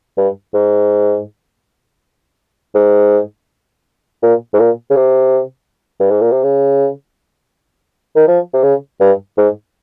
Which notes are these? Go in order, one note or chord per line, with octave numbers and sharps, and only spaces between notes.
G2
G#2
G#2
A#2
G#2
A#2
C#3
C3
G2
G#2
A#2
C3
C#3
D#3
F3
C3
C#3
G2
G#2